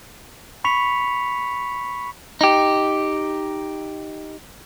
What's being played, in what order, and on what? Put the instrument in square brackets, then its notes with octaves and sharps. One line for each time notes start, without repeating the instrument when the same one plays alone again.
[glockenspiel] B5 C#6 B6 C#7 F7
[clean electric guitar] D#4 G4